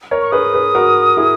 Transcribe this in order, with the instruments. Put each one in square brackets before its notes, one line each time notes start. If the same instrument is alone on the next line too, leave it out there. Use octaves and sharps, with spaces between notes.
[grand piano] A#4 C#5
[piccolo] C#6
[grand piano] G#4 B4 [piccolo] D#6
[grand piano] G#4 B4
F#4 A#4
E4 G#4